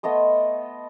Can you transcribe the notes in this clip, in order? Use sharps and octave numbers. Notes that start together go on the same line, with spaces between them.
A3 B3 D#5 C6